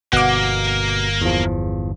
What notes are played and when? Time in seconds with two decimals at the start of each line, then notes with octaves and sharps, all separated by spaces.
0.13 G1 B2 A#3 F#5 D6
1.22 E2 F3